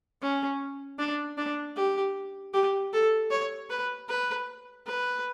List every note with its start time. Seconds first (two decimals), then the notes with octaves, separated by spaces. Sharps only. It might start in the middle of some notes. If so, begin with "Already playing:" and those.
0.22 C#4
0.99 D4
1.37 D4
1.76 G4
2.53 G4
2.93 A4
3.31 C#5
3.70 B4
4.09 B4
4.86 B4